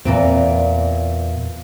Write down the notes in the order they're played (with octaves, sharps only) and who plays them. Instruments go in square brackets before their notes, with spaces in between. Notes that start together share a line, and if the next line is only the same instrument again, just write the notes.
[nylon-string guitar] E2 A#2 C4